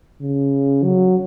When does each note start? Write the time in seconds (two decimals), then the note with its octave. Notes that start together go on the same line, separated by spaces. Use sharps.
0.21 C#3
0.84 F#3